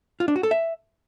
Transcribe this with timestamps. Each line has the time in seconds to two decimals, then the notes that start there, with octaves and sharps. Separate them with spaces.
0.20 F4
0.28 D4
0.36 F#4
0.43 A4
0.51 E5